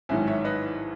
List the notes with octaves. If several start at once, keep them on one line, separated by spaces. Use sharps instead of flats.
A1 G#2 D#3 F#3 E5 G#5
C#5 E5
B4 D#5